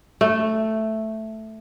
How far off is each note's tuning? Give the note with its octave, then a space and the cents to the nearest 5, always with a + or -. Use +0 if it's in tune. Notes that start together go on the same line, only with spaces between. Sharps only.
A3 +0